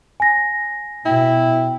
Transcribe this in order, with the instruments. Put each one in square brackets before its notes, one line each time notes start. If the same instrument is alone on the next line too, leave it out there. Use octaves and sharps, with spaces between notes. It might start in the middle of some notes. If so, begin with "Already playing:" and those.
[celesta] G#5 A#6
[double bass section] B2 [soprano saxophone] E4 [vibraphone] G5